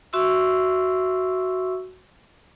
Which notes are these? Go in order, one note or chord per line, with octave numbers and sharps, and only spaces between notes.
F#4 E5 C6 C#6 E6